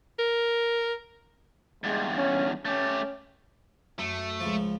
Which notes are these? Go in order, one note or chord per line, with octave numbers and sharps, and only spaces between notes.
A#4
E2 G2 G#3
C#4
A3 C#4 G4
F#2 A3
C#2 F3